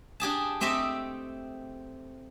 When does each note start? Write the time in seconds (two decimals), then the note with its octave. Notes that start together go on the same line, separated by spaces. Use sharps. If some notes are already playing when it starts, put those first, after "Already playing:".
0.20 D4 G4 G#4 A5
0.61 A3 C4 G4 D#5 E5